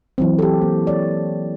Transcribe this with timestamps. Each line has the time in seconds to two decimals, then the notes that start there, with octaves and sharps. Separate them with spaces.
0.18 E3 F#3 C4
0.39 G4 A4
0.62 A#3
0.87 C#5 D5